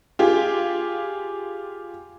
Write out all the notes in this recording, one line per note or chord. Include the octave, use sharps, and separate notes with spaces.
F4 G4 G#4